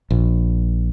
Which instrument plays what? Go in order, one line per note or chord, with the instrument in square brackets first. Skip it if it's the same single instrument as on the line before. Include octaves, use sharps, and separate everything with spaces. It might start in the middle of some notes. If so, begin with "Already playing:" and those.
[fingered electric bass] A#1